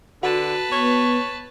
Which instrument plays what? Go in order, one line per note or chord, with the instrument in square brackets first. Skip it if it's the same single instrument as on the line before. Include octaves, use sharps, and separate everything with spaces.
[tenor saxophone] D3 [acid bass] F#4 [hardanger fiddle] B4 A5
[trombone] B3 [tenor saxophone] C#5